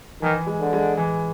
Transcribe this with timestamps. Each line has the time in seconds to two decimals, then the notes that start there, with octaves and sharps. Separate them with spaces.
0.22 D#3 E3
0.47 G#3
0.60 D3
0.73 G#3
0.97 E3